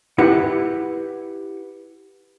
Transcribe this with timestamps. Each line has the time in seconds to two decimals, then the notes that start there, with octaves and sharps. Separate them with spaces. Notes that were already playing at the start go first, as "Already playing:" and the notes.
0.18 E4 G4 B4 F#5